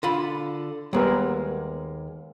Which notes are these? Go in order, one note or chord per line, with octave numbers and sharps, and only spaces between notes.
D3 F4 B5
D#2 G3 G#3 B3 A#4